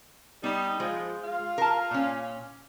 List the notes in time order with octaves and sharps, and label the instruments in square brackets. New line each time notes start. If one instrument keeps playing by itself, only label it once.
[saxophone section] G3 D#4 [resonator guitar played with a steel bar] B3
[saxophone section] F3 [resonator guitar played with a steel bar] G#3
[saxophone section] F4 F5
[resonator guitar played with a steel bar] A#4 A5
A#2 C#4